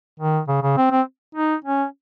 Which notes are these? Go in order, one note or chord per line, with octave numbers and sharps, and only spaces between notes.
D#3
C#3
C#3
C4
C4
D#4
C#4